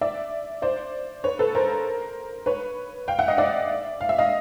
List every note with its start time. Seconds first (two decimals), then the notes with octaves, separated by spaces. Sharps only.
0.01 D5 E5
0.62 C5 D5
1.24 B4 C#5
1.39 A4 B4
1.55 A#4 C5
2.46 B4 C#5
3.08 F5 G5
3.19 E5 F#5
3.28 D#5 F5
3.38 D5 E5
4.01 F5
4.09 E5
4.18 D#5 F5